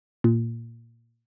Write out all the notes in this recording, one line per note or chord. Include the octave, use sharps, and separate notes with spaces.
A#2